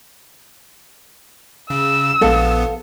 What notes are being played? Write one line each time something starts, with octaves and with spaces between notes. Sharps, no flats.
C#3 E6
A#1 B3 A4 F5 A5